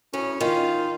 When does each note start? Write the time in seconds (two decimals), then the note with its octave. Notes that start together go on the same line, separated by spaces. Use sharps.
0.13 D2 A2 C#4
0.40 D#3 F4